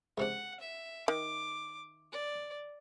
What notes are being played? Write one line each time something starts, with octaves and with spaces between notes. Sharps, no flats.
C#2 C3 D4 F#5
E5
D#3 D6
D5